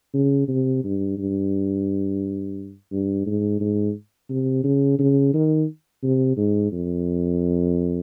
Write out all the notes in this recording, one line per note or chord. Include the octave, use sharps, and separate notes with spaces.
C#3
C3
G2
G2
G2
G#2
G#2
C3
C#3
C#3
D#3
C3
G#2
F2